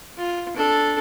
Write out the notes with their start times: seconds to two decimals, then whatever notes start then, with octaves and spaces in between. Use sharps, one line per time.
0.18 F4
0.56 D4 A4